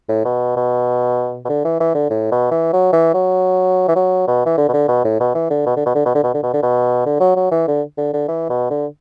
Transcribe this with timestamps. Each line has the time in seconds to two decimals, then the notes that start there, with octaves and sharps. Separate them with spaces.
0.09 A2
0.25 B2
0.56 B2
1.45 B2
1.49 D3
1.65 E3
1.80 E3
1.95 D3
2.10 A2
2.31 B2
2.51 E3
2.73 F#3
2.92 E3
3.14 F#3
3.88 E3
3.95 F#3
4.27 B2
4.46 E3
4.57 D3
4.68 B2
4.73 D3
4.88 B2
5.04 A2
5.20 B2
5.35 E3
5.50 D3
5.66 B2
5.76 D3
5.86 B2
5.95 D3
6.05 B2
6.15 D3
6.23 B2
6.34 D3
6.43 B2
6.53 D3
6.63 B2
7.06 D3
7.20 F#3
7.36 F#3
7.51 E3
7.68 D3
7.97 D3
8.13 D3
8.28 E3
8.49 B2
8.70 D3